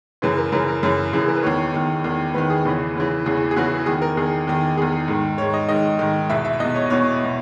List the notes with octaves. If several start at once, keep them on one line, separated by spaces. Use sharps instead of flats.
F#2 C#3 E3 B4
A#4
F#2 C#3 E3 A#4
A#4
F#2 C#3 E3
F#2 C#3 E3
G#4
A#4
B4
E2 D#3 C#5
E2 D#3
E2 D#3
E2 D#3 B4
G#4
E2 C#3 E3
E2 C#3 E3
E2 C#3 E3 G#4
G#4
E2 C#3 E3 F#4
E2 D#3 G#4
A#4
E2 D#3 G#4
E2 D#3
E2 D#3 G#4
G#2 D#3
G#2 D#3 C#5
D#5
G#2 D#3 D#5
G#2 D#3
E2 B2 E5
E5
E2 B2 D#5
C#5
D#5
E2 B2 C#5
B2